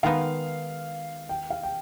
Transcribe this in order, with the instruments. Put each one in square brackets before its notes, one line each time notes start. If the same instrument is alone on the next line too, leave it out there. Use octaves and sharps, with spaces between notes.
[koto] D#3 G#3 B3 D#4 [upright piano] F5
[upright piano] G5
F5
G5